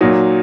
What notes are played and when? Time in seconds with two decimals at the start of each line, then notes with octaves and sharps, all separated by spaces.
0.01 A#2 F#3 D#4